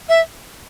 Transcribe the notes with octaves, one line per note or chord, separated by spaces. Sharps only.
E5